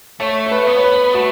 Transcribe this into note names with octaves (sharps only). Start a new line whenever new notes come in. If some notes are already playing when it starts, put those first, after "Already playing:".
A3 C#5
C#5
B4
B3
C#5
B4
A3 F#4